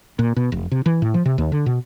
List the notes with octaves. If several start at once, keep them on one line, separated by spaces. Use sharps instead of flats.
A#2
B2
F1
C3
E3
A2
F3
C3
D#2
D3
B2